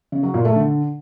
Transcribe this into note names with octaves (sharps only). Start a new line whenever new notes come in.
C#3
F#3
A#2
A3
D3